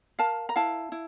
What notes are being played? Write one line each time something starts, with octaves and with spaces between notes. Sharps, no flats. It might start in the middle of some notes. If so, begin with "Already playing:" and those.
A#4 F5 A5
A#5
E4 F5 A5
E4